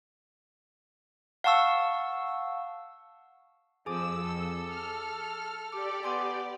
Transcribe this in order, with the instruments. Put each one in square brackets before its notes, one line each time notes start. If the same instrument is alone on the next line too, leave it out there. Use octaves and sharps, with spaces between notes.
[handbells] F5 F#5 A5 C#6 E6
[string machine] F2 E6 [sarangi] F3 [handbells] G#4 G#5 D6
[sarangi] A4
[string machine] F6
[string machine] G4 D5 [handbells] D6
[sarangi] B3 [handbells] G#5 C6 D6